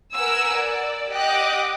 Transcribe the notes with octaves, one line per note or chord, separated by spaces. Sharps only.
A#4 B4 F#5 G#5 E6
D5
G4 D#5 F#5 G5 D6 F#6